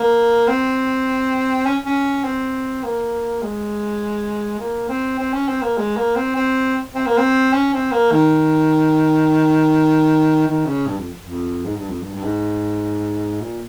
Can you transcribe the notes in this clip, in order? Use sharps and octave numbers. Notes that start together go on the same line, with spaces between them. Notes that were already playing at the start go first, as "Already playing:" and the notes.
Already playing: A#3
C4
C#4
C#4
C4
A#3
G#3
A#3
C4
C4
C#4
C4
A#3
G#3
A#3
C4
C4
C4
A#3
C4
C#4
C4
A#3
D#3
D#3
C#3
G2
F2
F2
G#2
G2
F2
G2
G2
G#2
A#2